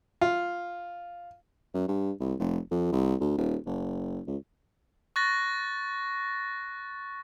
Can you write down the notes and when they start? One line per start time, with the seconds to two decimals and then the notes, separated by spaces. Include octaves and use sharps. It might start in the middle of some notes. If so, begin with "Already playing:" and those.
0.21 F4
1.74 F#2
1.88 G2
2.20 C2
2.39 F1
2.71 F2
2.92 C2
3.20 D2
3.37 D#1
3.66 F#1
4.27 C#2
5.16 C#6 F#6 A6 A#6